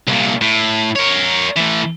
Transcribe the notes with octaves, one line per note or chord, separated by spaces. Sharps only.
C2 A#2
A2
A#4 C#5
E3 A3